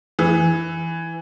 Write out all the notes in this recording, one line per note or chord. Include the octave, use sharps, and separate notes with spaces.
E3